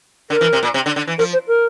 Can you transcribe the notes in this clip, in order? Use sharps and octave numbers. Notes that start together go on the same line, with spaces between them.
D3 A#4
E3
C3
A#2
C3
D3
D3
E3
F3 A#4
C5
A#4